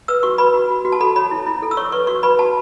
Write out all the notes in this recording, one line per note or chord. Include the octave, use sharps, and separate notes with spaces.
B4 E6
F#4 C#6
B4 B5
F#4
F#4
F#4
A5
A4 B5
C#5 B5
E4
E4
A4
E6
C#5 C#6
B4 C#6
F#4 C#6
B4 B5
F#4 A5